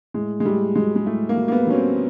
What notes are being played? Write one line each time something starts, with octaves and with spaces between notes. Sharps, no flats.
A2 G#3
G#3
A2 G3
F#3 G#3
G#3
A2 A3
A#3
F#3
A#3
B3
F#3 C#4
C4